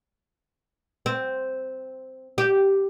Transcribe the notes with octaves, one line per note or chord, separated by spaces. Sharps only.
C4
G4